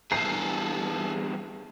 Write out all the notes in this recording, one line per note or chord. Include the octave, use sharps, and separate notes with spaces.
E2 G2 G#4 A4 C7